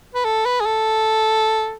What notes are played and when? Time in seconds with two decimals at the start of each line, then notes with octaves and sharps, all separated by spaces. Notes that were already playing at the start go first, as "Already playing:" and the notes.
0.15 B4
0.24 A4
0.45 B4
0.61 G#4
0.66 A4